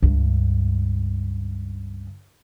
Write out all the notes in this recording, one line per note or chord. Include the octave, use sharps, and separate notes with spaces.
C#2 G2